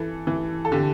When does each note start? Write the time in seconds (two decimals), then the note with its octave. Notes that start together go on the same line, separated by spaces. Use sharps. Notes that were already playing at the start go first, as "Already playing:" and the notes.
Already playing: E3 A4
0.27 E3
0.65 A4
0.72 D3 G4